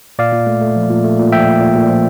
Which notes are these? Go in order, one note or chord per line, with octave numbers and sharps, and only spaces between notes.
A#2 D5 F5
A#2
A3
A3
F3
A#2
A3
A#2
F3 E5 G5
A#2
A#2
A#2
F3